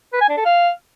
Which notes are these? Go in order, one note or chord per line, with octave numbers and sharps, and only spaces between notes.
B4
G#5
D4
A4
F5